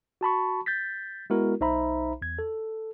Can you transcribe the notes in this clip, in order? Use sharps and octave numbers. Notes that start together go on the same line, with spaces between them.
F#4 A5 B5 C#6
G6 A6 B6
G#3 B3 E4 F#4 A#4
B1 D#4 C5 E5 A#5 B5
E2 G#6
A4